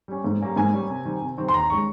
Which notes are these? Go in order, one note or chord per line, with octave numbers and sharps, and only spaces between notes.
G3 C#4
G#2
G3 A#3 C#4
G#2 G#5
G3 A#3 C#4
C3
D#3 G3 C4
C3
D#3 G3 C4
C6
D#2 A#5
D#3 G#3 C#4 C#6